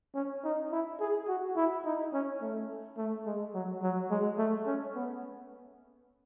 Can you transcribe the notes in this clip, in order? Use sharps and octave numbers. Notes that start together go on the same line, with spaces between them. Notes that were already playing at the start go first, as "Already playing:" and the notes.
C#4
D#4
E4
G#4
F#4
E4
D#4
C#4
A3
A3
G#3
F#3
F#3
G#3
A3
C#4
B3